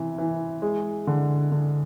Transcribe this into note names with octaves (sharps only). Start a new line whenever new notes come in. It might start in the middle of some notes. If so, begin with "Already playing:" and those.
Already playing: C3 E3
E3
G#3
D3
D3